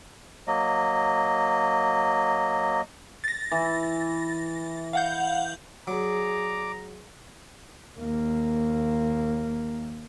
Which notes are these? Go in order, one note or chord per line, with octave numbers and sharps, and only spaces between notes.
F#3 A#3 D#5
A6 A#6
E3
F5 F#5 G6
F#3 G#4 D5 A#5 D6
D#2 A#3